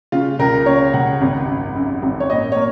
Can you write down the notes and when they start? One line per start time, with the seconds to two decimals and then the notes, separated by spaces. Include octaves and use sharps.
0.12 C#3 F4
0.39 C#2 A#4
0.66 C#3 C#5
0.94 C#2 F#5
1.21 G#1
1.48 F#2
1.75 F#2
2.02 G#1
2.20 C#5
2.30 A#2 D#5
2.52 C#5
2.56 A#3